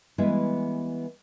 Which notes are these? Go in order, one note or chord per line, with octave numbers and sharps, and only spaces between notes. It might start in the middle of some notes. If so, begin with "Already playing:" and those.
E3 G3 G#3 B3 E4 B4